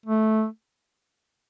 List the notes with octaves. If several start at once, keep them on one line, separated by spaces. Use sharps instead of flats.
A3